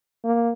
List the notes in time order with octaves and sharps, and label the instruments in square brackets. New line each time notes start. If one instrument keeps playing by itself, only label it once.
[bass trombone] A#3